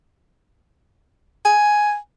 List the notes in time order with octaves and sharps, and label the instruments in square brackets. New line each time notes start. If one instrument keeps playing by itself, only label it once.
[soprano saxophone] G#5